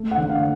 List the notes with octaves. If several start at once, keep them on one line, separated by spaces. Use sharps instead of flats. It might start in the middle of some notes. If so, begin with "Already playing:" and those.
Already playing: A3
F#5
D3
F5